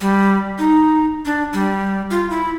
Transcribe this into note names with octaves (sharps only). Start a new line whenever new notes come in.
G3
D#4
D4
G3
F4
E4